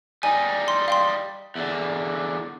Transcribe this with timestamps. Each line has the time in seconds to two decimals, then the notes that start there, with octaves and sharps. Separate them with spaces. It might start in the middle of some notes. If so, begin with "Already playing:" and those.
0.23 G3 D#4 G#5
0.68 C6
0.88 F5 G5 C6
1.55 E2 D3